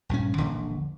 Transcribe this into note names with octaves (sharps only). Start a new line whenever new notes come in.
A#1 G2 D3 C#4
E1 A#1 D3